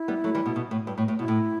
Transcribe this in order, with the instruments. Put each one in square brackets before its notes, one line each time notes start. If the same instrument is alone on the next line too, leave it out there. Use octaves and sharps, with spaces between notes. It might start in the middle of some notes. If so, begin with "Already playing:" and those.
Already playing: [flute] E4
[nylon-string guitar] G3 B3
F#3 A3
E3 G3
B2
B2
A2
G2
A2
A2
[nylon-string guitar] B2 [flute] E4
[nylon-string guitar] A2